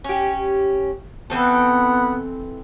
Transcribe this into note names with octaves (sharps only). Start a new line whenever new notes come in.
C#4 G4
E3 B3 C4 A4